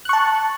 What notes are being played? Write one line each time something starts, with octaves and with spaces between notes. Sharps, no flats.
A5 C#6 F#6